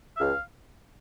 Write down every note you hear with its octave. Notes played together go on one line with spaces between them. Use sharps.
E5
C#2 F5